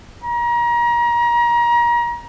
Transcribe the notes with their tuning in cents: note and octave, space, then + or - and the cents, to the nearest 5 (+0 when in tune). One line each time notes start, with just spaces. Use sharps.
A#5 +30